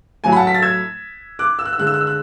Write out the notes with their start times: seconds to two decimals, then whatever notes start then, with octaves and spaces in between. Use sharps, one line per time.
0.24 A2 F#3 A3 G#5
0.32 B5
0.36 F#5 A5
0.47 B6
0.54 A6
0.62 E6 G#6
1.39 D6 F#6
1.59 E6
1.65 F#6
1.73 E6
1.78 D3 G#3 F#6
1.87 E6
1.94 F#6
2.01 E6
2.07 F#6